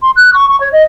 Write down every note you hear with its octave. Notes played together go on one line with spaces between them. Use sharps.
C6
F#6
C#6
C#6
C#5
D#5